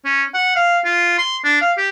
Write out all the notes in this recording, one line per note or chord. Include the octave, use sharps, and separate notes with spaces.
C#4
F#5
F5
F4
C6
D4
F5
G4